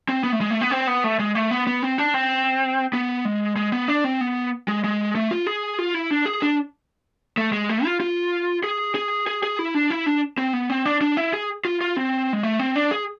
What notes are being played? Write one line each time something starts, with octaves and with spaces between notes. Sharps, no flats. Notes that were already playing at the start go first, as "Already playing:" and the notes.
C4
B3
A3
G#3
A3
B3
C4
B3
A3
G#3
A3
B3
B3
C4
D4
C4
B3
G#3
G#3
B3
D4
C4
B3
G#3
G#3
A3
F4
G#4
F4
E4
D4
G#4
D4
A3
G#3
A3
F4
F4
G#4
G#4
G#4
G#4
E4
D4
E4
D4
C4
B3
C4
D4
D4
E4
G#4
F4
F4
C4
G#3
A3
C4
D4
G#4